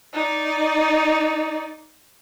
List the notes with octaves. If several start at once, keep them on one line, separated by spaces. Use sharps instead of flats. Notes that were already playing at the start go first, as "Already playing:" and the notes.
D#4 D5